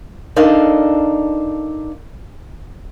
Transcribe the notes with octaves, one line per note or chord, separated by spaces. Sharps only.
D4 D#4 A4 A#4 F5